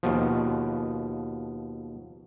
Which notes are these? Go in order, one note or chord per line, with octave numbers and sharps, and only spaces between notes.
D#2 B2 F3